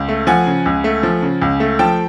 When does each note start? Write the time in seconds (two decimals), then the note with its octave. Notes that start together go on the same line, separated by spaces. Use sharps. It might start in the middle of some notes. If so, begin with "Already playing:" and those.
Already playing: C#2
0.08 A3
0.27 F3 F#5 G#5
0.47 C#3
0.66 C#2
0.84 A3
1.03 F3
1.22 C#3
1.42 C#2
1.60 A3
1.79 F3 G5 A5